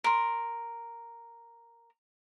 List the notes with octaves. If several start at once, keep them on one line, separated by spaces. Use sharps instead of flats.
A#4 C6